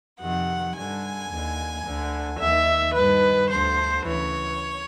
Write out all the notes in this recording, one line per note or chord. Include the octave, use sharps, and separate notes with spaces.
F2 C3 D#3 F#5
G2 D3 G#5
D#2 D3
D2 D3
D#2 D#3 E5
G2 D#3 B4
D2 D3 C5
D2 C#3 E3 C#5